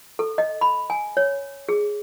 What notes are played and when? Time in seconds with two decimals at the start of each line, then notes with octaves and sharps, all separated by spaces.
0.19 A4
0.38 D#5
0.61 B5
0.90 G#5
1.17 C#5
1.69 G#4